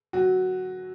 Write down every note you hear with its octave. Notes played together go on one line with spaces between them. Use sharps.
F#3 F#4